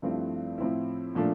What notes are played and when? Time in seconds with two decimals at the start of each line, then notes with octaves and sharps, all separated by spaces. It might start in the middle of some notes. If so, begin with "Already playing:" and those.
0.02 G2 F3 A3 C4 E4
0.58 A2 F3 C4 E4
1.15 A#2 F3 A3 D4